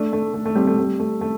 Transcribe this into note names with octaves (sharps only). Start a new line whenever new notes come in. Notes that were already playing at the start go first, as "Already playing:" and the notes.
Already playing: A3 D4
A3
A3
A3
G3 C4
A3
G3
A3
A3